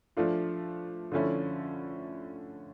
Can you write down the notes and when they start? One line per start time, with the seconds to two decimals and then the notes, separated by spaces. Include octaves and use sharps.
0.17 F3 A3 D4 F4
1.12 D3 F3 A3 C#4 E4